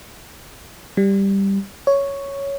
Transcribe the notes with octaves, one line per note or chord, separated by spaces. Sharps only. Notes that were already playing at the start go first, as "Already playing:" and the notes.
G3
C#5